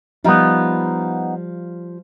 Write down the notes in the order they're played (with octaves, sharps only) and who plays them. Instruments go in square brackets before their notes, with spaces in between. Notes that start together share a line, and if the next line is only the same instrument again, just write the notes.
[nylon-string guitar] F3 G3 F4 [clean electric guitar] B3 D#4